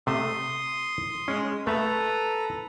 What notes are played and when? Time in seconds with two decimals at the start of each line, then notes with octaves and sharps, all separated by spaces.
0.07 C3 A3 E5 C6 D#6
1.28 G#3 C#4
1.67 A3 A4 B4 E5 A#5